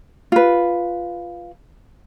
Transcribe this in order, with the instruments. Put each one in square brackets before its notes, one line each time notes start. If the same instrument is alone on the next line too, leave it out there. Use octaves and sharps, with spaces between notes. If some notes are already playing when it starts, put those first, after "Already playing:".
[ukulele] F4 B4